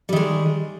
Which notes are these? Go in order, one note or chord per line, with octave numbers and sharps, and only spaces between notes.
D#3 G3 G#3